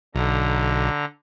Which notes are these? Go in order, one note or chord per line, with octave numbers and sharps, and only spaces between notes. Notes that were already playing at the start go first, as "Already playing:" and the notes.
B1 D3 A#5